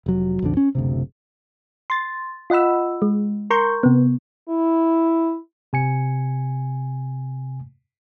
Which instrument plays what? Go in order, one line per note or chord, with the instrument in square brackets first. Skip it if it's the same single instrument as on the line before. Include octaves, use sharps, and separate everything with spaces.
[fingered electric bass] F1 F#3
B1 F2 D3
C#4
F#1 D2 C3
[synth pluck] C6 A6
F4 D#5 F#5 B5 E6
G#3
A#4 A#5 C6 C#6 G6
C3 B3
[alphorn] E4
[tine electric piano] C3 G#5 C#7